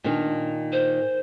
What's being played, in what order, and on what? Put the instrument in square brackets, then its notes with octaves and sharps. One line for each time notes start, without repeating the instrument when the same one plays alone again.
[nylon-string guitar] A#2 D#3 [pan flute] D4
[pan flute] C5